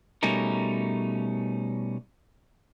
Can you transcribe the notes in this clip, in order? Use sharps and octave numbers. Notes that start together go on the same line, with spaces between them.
B2 G3 A3 C#4 D#4 A#4